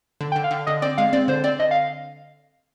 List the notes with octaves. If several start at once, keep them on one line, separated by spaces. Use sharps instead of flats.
D3
G5
D3
F5
D3
D3 D#5
C4 D5
G#3 F5
C4 D5
D3 C5
C4 D5
D3 D#5
F5